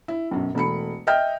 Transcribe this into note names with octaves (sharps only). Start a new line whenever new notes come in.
E4
B1 F#2
E1 A3 B5 C#7
D#5 E5 G5 F6 G6